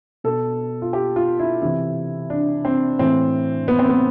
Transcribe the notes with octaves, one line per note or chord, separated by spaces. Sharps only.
B2 A4
F4
G4
F4
E4
C3 E3 E4
D4
C4
A2 E3 C4
B3
C4
B3